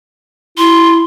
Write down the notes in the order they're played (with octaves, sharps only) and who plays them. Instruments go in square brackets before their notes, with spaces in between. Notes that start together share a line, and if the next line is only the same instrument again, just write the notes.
[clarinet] E4 [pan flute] C6